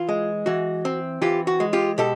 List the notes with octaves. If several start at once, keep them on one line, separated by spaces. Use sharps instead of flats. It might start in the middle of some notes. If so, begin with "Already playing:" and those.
Already playing: E3 F4
G#3
E3 F#4
C4
E3 F4 G4
F#4
G#3
F4 G4
B2 G4 A4